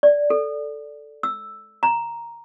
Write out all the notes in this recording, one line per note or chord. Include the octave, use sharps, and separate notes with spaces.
D5
A4
E6
A#5